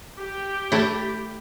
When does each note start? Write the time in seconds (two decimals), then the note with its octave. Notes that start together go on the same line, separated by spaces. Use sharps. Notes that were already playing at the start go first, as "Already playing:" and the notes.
0.17 G4
0.72 A3 E4